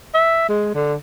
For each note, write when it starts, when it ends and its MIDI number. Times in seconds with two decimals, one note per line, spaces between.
0.14 0.47 76
0.49 0.70 56
0.74 0.95 50